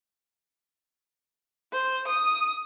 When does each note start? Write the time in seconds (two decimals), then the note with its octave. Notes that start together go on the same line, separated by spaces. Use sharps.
1.72 C5
2.08 D#6